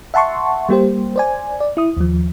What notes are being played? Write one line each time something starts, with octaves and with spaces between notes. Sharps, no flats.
E5 F#5 A5 C6 C#6
G3 A#3 G4 C5
C5 D5 G#5
D5
E4 D#6
D#2 F3